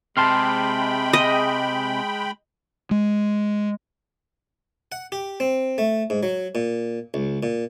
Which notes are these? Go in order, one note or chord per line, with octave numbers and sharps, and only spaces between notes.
C3 G#3 G5 A5 B5 C6 F6
D#5
G#3
F#5
G4
C4
A3
G#2
F#3
A#2
C#2
A#2